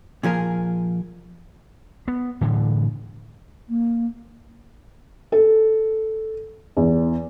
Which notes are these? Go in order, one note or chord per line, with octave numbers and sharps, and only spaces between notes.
A#2 F3 G#4 A#4
B3
A2 D3 E3
A#3
A4
E2